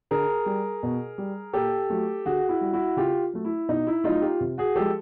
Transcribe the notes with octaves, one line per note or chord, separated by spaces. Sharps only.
D3 G#4 A#4
G3
B2
G3
A#2 G4 A4
F#3 A3
D3 F#4 G#4
E4 F#4
G3
E4 F#4
C#3 F4 G4
F#3 A3
E4
B2 D#4
E4
F#3 A3 D#4 F4
F4 G4
C3
F#4 G#4
F3 G#3 G4 A4